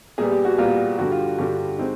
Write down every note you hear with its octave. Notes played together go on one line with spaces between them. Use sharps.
A#2 G3 B3 G#4
G4
F#4
A#2 G3 B3 F4
G2 D3 G3 F#4
F4
G2 D3 G3 F#4
G#3 C4 D#4